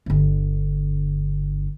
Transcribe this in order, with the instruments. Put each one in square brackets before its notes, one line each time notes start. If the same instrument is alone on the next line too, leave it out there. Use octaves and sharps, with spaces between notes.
[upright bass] G1 D3